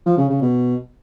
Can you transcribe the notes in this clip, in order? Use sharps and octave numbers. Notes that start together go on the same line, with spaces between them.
F3
C#3
C#3
B2